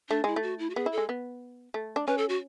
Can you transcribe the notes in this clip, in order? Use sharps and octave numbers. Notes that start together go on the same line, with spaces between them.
A3 D4
G#3 E4
A3
F#4
E4
F#4
B3 G#4
E4
A4
G#3
B3
A3
D4
C#4 B4
A4
F#4